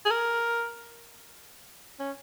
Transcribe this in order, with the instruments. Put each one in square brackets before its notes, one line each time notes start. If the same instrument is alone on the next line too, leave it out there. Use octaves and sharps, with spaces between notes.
[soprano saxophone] G#4
A#4
C#4